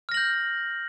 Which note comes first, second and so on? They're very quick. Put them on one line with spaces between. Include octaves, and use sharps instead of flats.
F6 A#6 F#7 G6